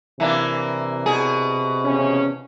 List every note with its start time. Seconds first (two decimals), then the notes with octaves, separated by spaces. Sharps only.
0.20 C3 E3 A#3 D4
1.06 B2 G#4
1.85 E2 C#3 C#4